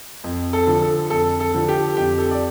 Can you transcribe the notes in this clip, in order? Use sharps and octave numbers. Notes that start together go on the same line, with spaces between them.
F2
A4
D3 F3
A4
F2 A4
A4
D3 F3
G4
F2 G4
A4
D5